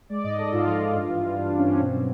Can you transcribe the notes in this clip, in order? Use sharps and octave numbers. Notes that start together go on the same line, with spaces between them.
G#3 D5
G#2 D#5
G#3 A4
G#2 F4
F3
G#2
G2
E3
G3
G2 D4
G2 D4
C#4
G2 C4
B2
F#3